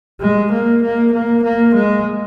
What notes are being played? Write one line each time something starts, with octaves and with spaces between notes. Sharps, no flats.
G#3
A#3
A#3
A#3
A#3
G#3